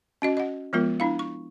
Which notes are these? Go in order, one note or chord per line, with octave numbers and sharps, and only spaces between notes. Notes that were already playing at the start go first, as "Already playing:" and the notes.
C#4 F#4 D#5
D#5 F#5
F3 G#3 B3 F4 A#4
D4 E4 F5
C#6